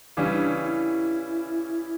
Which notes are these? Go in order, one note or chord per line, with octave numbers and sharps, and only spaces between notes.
C#3 E3 G3 C#4 D4
E4
D4
E4